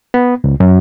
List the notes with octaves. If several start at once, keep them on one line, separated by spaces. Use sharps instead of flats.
B3
C#2
F#2